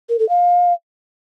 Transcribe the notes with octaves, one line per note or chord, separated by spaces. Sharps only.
A#4
A4
F5